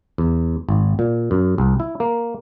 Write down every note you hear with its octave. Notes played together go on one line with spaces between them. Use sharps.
E2
G#1
A#2
F#2
C2
E4
A#3